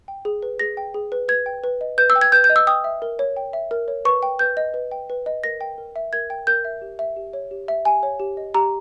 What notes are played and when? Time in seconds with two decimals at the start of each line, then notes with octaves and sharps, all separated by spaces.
0.08 G5
0.25 G#4
0.43 B4
0.59 G#4 A#6
0.77 G5
0.94 G#4
1.12 B4
1.28 B4 G#6
1.46 G5
1.64 B4
1.81 D#5
1.98 B4 G6
2.10 E6
2.16 G5
2.21 G#6
2.32 B4 G6
2.44 G6
2.50 D#5
2.56 E6
2.67 G5 D#6
2.84 E5
3.02 A#4
3.19 C#5
3.37 G5
3.53 E5
3.71 A#4
3.88 C#5
4.05 B4 C#6
4.23 G5
4.39 B4 G6
4.57 D#5
4.74 B4
4.92 G5
5.10 B4
5.26 D#5
5.44 A#4 A#6
5.61 G5
5.78 A#4
5.96 E5
6.13 A#4 G#6
6.30 G5
6.47 A#4 G6
6.65 E5
6.82 G4
6.99 E5
7.16 G4
7.33 C#5
7.51 G4
7.68 E5
7.85 G4 G#5
8.03 C#5
8.20 G4
8.37 D#5
8.54 G4 A#5